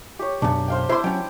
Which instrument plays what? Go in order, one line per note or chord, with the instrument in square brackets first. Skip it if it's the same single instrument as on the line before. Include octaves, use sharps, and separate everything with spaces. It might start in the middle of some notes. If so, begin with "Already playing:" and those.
[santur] G4 C#5
[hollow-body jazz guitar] B1 F#2 [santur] D4
[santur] C5 F5 G5
[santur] E4 D6 [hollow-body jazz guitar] C5 C6
[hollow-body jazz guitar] F#3 C#4 [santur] G5